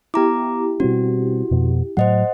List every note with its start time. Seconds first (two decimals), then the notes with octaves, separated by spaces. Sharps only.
0.14 B3 E4 G4 A#5 D6
0.80 B2 G3 C4 F#4
1.51 F2 B2
1.97 A2 F#3 C5 D#5 F#5